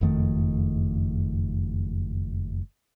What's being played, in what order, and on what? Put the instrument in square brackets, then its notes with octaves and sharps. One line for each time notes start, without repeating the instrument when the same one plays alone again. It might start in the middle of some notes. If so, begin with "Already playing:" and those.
[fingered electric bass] F#1 F2 D#3 A3